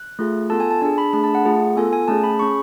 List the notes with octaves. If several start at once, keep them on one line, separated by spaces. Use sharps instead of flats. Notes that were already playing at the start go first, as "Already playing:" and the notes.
Already playing: F#6
A3 F4 G#4
B3 F4 A4 A5
G#5
A5
D4 G#4 A5
B5
A3 D4 G#4 B5
A5
F#5
A3 F4 G#4
B3 F4 A4 G#5
G#5
A3 C#4 G#4 A5
B5
C#4 G#4 C#6